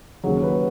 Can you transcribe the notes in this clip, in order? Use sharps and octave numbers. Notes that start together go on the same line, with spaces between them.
D#2 C#3 F#3 G#4
B4